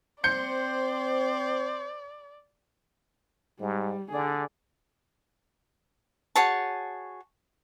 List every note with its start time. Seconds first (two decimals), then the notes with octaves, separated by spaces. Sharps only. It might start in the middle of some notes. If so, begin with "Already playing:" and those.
0.24 C4 C5 D5 G6 C#7
3.60 G#2 G3
4.11 D3 G#4 D5
6.35 F#4 G#4 C#5 A5